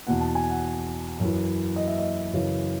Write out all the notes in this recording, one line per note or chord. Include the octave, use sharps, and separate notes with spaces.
E2 B2 F#5
A5
G#5
F#5
F#2
E3
D#5
E5
D#5
F#2 C#3 E3